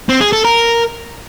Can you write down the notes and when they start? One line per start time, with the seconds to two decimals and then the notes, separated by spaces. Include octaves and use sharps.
0.09 C4
0.21 G#4
0.33 A4
0.45 A#4